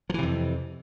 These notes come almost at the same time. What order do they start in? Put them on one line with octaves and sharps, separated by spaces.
F3 E3 C3 F2